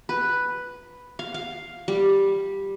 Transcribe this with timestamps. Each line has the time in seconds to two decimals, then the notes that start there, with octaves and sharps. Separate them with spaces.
0.09 B4
1.19 F5
1.34 F5
1.88 G3